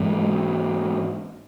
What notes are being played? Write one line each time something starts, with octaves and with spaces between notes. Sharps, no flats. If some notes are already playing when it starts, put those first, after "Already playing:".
Already playing: G#2 E3 G#3